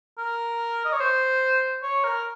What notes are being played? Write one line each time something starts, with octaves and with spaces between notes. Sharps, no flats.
A#4
D#5
C#5
C5
C#5
A#4